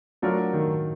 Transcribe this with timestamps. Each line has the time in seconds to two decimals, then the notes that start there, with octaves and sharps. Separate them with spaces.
0.22 F#3 A3 D4 F4 A#4
0.53 D#3